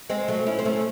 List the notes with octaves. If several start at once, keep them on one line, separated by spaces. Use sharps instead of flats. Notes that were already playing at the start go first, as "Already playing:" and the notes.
G#3 C4
F#3 A3
C#4 E4
C4
A3 C#4